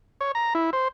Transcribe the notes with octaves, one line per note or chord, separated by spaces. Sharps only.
C#5
A#5
E4
C5